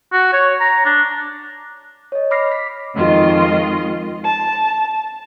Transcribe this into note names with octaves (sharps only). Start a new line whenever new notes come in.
F#4
C#5
A#5
D4
C#5 D#5
B5 D6 F6 A#6 C7
B6
F2 D#3 G#3 F4 D#5 C6
A5